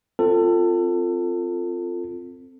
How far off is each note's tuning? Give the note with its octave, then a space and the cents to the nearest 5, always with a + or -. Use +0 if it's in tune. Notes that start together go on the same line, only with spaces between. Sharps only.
C4 +0 F4 +0 A4 +25